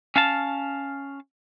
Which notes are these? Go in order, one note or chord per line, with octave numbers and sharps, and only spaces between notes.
C#4 F5 A5